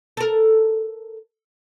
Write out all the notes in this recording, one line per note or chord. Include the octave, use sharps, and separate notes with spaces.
A4 A#4